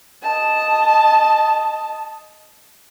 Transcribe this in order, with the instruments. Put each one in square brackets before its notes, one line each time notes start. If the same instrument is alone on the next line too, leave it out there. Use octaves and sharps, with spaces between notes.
[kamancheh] D#5 A5